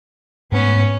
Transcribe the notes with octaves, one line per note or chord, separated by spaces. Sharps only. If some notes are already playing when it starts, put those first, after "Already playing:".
G#2 G#3 A3 B3 C#4